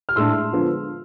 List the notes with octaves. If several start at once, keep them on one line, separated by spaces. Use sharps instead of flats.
F6
A2 G#3 D4 C6 E6
D3 F3 G#3 B3